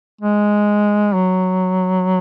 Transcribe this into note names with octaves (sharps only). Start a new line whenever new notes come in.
G#3
F#3